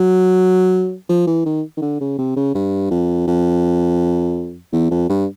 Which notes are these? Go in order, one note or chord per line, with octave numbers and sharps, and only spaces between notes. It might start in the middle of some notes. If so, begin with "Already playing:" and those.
Already playing: F#3
F3
E3
D#3
D#3
D3
C#3
C3
C#3
G2
F2
F2
E2
F2
G2